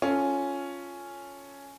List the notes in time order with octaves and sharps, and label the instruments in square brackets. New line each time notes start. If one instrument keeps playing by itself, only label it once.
[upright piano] C#4 F4 A4